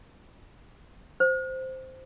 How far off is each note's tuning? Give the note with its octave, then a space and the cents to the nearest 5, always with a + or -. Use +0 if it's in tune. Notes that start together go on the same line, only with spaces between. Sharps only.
C5 -5